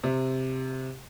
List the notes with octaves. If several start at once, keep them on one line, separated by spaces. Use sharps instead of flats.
C3